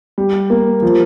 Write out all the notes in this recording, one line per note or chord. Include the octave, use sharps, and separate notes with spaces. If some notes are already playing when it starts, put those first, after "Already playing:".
G3
A#3
F3